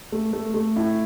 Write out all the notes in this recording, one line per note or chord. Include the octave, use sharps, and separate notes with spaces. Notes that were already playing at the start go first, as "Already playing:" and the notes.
A3
A3
A3
E4